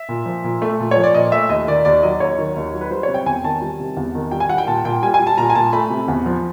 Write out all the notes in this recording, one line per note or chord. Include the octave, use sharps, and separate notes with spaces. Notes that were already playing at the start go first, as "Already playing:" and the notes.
Already playing: E5
A#2
F3
A#2
A3
A#2
C#5
F3
D5
A#2 D#5
A3 E5
D#2 D#5
D#3 D5
D#2 D5
F#3 D#5
D#2 C#5
D#3
D#2
F#3
B4
G3 C5
C3 C#5
G5
E2 G#5
D#3 A5
G3
C3
E2
D#3
G3 G5
G#5
G3 F#5
G5
A#2 A5
A#2 G5
G3 G#5
G#5
G3
A5
A#2 A#5
G#5
A#2 A5
A3 B5
C3
E2
F3